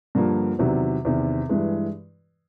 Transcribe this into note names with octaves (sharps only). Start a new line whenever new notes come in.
G2 D3 F3 A#3
E2 C3 D#3 F#3
E2 C3 D#3
G2 E3 G#3